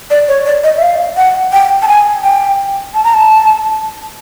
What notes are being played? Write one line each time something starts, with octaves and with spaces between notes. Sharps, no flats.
D5
C#5
D5
D#5
E5
F5
F#5
G5
A5
G#5
G5
A5
A#5
A5